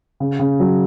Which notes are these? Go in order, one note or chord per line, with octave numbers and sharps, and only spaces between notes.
C#3
C#3
F#3